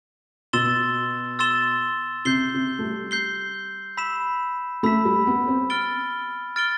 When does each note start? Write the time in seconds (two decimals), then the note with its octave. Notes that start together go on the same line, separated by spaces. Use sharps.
0.53 B2 C6 E6 A6 E7 G7
1.39 C6 E6 A6 E7 G7
2.25 C3 G6 C7 G7
2.54 C3
2.79 A3
2.83 G3
3.11 G6 C7 G7
3.97 B5 E6 B6 E7
4.83 A3 B5 E6 B6 E7
5.05 G3
5.27 B3
5.48 C4
5.70 F6 A6 D7 G7
6.56 F6 A6 D7 G7